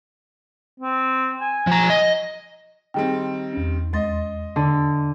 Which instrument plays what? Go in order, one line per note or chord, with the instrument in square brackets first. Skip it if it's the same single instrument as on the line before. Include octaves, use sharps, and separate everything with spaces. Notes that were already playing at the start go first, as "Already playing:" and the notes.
[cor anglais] C4
G#5
[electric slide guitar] F3 A#5
D#5
[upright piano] D#3 G3 C4 [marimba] G#4 G5
[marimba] E2 C#4
[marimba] D#2 G#3 A6 [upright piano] D#5 C6
[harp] D3 D4